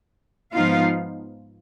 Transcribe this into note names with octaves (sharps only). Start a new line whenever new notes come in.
G#2 F3 B3 D#4 F4 F5